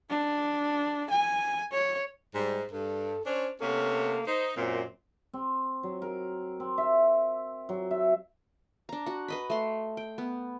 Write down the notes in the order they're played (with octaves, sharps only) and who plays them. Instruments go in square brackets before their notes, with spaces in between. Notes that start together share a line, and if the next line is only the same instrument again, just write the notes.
[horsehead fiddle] D4
G#5
C#5
[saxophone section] G#2 [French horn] G3
[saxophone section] G2 [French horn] A4
[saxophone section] C#4 D4 C#5 [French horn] C5
[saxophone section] C3 B3 C#4 [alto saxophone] A#3 [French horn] A4
[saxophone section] D#4 [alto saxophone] C5
[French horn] F#2 [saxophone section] A#2 [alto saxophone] C4
[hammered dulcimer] C4
F#3
A#4
C4
E5
F#3
E5
[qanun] D4 A#5
F#4 F#5
B4 D#5 B5
A3 C6
G5
B3